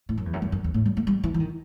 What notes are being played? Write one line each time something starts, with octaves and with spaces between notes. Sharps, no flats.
A2
F#2
E2
F#2
G2
F#2
E2
A2
G3
A3
G3
E3
E3
D#3